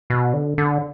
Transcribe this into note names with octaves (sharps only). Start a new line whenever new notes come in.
B2
D3
D3